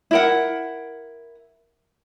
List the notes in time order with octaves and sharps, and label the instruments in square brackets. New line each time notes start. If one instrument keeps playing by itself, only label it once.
[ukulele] E4 A#4 F#5